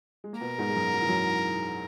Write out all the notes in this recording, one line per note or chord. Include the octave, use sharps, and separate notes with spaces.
G#3
A#3
B2 B3 A#4
G#2 G#3
G#3
F#2 F#3
F#3
E3
F#2 F#3